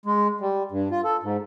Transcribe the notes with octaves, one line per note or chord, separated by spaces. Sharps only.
G#3
G3
G2
F4
A4
G#2